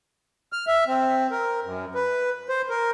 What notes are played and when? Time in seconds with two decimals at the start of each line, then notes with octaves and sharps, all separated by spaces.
0.53 F6
0.67 E5
0.87 C4
1.31 A#4
1.64 F#2
1.95 B4
2.49 C5
2.69 A#4